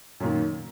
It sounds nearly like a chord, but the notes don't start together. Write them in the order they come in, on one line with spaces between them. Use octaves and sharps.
F#2 A#2 D#3